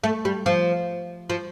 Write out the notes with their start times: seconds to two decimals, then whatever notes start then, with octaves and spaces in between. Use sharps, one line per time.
0.04 A3
0.25 G3
0.46 F3
1.30 F3